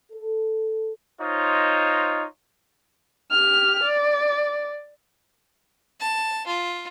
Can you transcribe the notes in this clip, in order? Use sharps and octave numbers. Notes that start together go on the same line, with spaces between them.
A4
D#4 F4 C5 C#5 D#5
G4 F6
D5
A5
F4